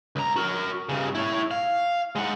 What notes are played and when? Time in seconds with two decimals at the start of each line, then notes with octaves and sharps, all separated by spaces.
0.16 C#2 A#5
0.36 F#4 A#4
0.89 G2 C#3
1.15 E4 C#5
1.51 F5
2.16 G#3 F#5